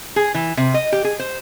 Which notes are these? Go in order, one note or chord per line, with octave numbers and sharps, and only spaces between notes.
G#4
E3
C3
D#5
G4
G#4
C5